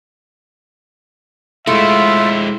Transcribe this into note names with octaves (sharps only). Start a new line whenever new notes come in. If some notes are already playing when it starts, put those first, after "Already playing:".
G#3 A3 E4 F4 E5